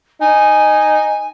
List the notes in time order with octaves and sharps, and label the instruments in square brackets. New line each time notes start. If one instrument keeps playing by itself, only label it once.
[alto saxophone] D#4 [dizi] G#5